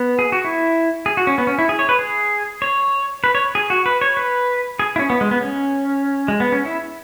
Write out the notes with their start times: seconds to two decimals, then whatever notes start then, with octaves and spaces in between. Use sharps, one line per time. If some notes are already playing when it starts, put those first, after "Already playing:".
Already playing: B3
0.19 G#4
0.32 F#4
0.45 E4
1.06 G#4
1.17 F#4
1.27 C#4
1.38 B3
1.47 C#4
1.59 E4
1.69 G#4
1.79 C#5
1.89 B4
1.99 G#4
2.62 C#5
3.24 B4
3.35 C#5
3.55 G#4
3.70 F#4
3.86 B4
4.01 C#5
4.17 B4
4.79 G#4
4.96 E4
4.99 C#4
5.10 B3
5.21 G#3
5.31 B3
5.41 C#4
6.28 G#3
6.40 B3
6.52 C#4
6.65 E4